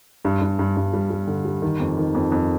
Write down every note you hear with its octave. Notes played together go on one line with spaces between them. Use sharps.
G2
G2
G2
G2
G3
G3
D3
G3
D#3
F2
D#3
F2
F2